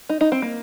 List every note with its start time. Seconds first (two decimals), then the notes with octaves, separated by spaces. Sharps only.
0.09 D#4
0.21 D#4
0.32 C4
0.42 A#3